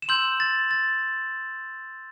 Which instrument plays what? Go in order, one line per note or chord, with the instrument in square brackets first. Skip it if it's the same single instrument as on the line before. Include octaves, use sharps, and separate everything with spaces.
[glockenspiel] E7
C6 E6 G6 F#7
A6
A6